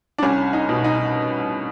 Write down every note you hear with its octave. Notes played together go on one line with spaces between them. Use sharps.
D4
C2 C#4
D#4
B2
D#4